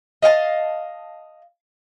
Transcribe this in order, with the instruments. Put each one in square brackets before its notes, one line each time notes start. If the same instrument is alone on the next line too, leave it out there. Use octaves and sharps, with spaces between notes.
[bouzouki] D#5 F5 G5 A5